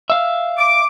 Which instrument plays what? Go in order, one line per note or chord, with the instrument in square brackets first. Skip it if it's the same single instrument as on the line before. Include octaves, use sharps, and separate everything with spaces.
[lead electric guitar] E5 F5
[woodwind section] D6